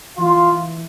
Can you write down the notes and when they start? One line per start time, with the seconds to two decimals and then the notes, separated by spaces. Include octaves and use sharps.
0.18 E3 F4